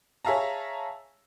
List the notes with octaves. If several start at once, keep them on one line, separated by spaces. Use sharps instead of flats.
G#4 C#5 E5 F5 A5 A#5